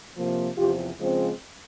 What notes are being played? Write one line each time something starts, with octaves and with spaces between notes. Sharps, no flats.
C3 F3 A#3
E2 C3 F3 F4 G4
C#3 F3 G#3 C4